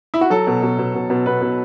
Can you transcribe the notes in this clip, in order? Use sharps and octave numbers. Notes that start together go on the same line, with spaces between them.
E4
F#4
F#3 A4
B2
B2
B2
B2
B2
B2 B4
B2